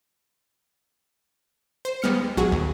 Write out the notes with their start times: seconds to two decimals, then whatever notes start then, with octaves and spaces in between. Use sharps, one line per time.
1.85 C5
2.02 D#2 G3 G#3 B3 F6 C#7
2.37 A#1 F#3 F#4 G#4
2.52 D#2